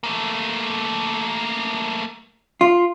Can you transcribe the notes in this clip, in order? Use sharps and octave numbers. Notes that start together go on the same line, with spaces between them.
A3 A#3
F4